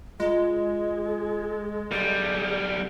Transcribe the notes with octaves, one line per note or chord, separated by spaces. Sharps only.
G#3 F4 G#4 D#5
B1 G3 G#4 A4